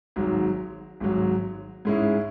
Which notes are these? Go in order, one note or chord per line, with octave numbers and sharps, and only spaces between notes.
G#1 G#2 F#3
G#1 G#2 F#3
G#2 G#3 C#4 E4